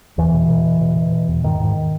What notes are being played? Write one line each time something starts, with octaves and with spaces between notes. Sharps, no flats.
E2 E3
B2
B2
B2
B2
B2
B2
E2
G#2 D#3
G#2